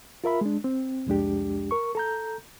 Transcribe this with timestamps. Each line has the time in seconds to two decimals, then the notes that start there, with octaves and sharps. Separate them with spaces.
0.24 F4 A#4 E5 B5
0.41 G#3 D4
0.64 C4
1.07 C2 F2 G#3 D4 G4
1.71 A#4 C#6
1.95 A4 A#5 G6